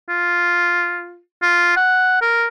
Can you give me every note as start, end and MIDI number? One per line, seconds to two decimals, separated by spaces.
0.09 1.20 65
1.42 1.74 65
1.76 2.21 78
2.22 2.47 70